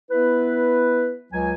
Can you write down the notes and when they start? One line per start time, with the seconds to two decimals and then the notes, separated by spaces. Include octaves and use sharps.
0.10 B3 E4 B4
1.33 C#2 F#3 G#5